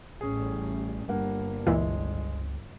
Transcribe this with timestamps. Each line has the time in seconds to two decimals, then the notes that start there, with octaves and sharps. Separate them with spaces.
0.21 A1 A2 G3 C#4 G#4
1.08 G1 G2 A#3 F#5
1.67 C#2 A#2 E3 G#3 E4